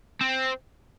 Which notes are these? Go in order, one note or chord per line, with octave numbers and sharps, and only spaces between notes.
C4